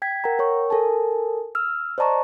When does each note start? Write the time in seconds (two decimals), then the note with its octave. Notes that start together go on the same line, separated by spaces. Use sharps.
0.02 G5 G#6 B6
0.24 A#4 F#5 G5 A#5
0.39 A#4 C#5 G5 C#6
0.70 A4 A#4 G#5 A5
1.55 E6 F6
1.98 C5 D5 D#5 A5 A#5 C#6